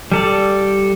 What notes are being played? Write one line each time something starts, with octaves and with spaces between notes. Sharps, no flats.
G3 A4 D5